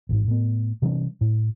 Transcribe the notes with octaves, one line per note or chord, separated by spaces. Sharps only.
A1 G#2
A2 B3
C3 E3 G3 C#4
A2